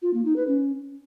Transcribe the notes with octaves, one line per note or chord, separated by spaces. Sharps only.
F4
A#3
D#4
B4
C#4